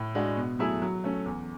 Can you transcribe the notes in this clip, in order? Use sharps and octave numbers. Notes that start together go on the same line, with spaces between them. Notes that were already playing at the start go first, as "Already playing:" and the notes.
Already playing: A2
G#3 D4 F#4
B2
F#3 A3 E4 G#4
F#3
A3 C#4
E2